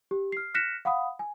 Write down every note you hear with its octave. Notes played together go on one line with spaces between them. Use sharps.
G4
F6 C7
F6 F#6 A#6 B6 C#7 E7
F5 F#5 B5 D#6
G#5